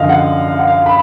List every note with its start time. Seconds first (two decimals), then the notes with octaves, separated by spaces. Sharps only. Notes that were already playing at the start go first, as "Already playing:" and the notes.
Already playing: F#2 D3 F3 D#5 F5
0.09 F#5
0.48 F5
0.59 F#5
0.67 F5
0.86 B5